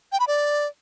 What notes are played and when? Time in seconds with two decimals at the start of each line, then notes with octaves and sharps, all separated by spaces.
0.12 G5
0.20 B5
0.28 D5